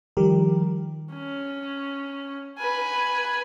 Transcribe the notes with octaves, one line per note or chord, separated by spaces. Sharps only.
D#3 F3 G3 G4 A#4
C#4
B4 G#5